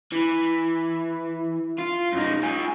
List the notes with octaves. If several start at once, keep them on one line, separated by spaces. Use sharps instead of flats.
E3
F4
F#2 D#4
F4 G#4